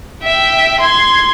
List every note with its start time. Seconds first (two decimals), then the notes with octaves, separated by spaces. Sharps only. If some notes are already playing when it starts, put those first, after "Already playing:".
0.23 E5 G5
0.80 C6 G#6